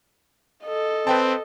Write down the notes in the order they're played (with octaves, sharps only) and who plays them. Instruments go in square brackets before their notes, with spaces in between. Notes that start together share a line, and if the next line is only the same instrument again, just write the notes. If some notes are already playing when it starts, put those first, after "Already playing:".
[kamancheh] A4 D#5
[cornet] C4 [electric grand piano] B4 G5 A5